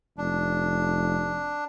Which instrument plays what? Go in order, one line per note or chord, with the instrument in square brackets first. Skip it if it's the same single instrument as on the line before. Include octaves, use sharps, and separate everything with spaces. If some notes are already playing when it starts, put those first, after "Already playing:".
[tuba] F1 [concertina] D4